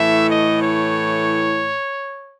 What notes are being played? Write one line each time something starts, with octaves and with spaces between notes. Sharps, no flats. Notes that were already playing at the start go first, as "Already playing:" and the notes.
Already playing: A2 E3 A3 E5
D#5
C#5